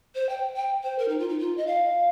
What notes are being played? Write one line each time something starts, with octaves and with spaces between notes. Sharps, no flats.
C5
G5
G5
C5
A#4
D#4
F4
D#4
F4
D#5
F5